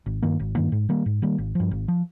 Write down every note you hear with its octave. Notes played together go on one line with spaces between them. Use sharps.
G#1
G2 D#3 A#3
G#1
G2 D#3 A#3
G#2
D#3 G3 A#3
G#2
D#3 G3 A#3
G#1
G2 F3
G#1
F3